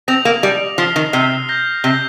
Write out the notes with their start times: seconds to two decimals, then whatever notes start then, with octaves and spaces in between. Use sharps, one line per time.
0.08 C4 D#6 A#6 F7
0.25 A#3
0.43 G3 D#6 A#6 F7
0.78 F3 F6 C7 G7
0.96 D#3
1.13 C3 F6 C7 G7
1.49 G6 A#6 G7
1.84 C3 G6 A#6 G7